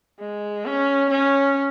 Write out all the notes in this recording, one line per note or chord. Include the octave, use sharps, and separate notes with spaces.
G#3
C#4
C#4